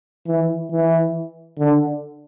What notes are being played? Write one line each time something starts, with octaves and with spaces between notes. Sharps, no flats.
E3
E3
D3